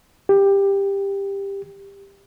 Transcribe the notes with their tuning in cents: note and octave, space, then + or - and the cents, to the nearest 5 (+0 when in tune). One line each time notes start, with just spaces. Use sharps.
G4 +15